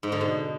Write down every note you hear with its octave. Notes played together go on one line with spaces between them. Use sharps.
G#2
D3
B2